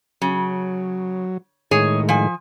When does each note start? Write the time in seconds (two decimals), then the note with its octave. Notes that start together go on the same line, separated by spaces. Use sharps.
0.22 C#3 F#3
1.71 A2 D#3 G#3 G#4 C#5
2.09 F3 G#5